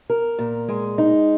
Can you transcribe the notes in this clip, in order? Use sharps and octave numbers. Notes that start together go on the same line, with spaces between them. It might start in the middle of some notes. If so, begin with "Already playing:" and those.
A#4
A#2
G#3
D#4